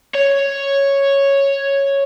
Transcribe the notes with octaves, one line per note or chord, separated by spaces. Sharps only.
C#5